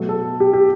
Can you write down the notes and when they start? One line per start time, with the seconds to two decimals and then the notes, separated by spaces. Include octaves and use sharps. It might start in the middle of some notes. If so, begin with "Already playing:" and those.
Already playing: B2 F#3 A3
0.09 A4
0.40 G4
0.53 G4